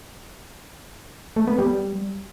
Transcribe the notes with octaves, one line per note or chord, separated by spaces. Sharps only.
A3
B3
G3